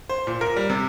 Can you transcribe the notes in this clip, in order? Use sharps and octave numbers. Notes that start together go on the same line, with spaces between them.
C5
A#2
A#4
G3
C3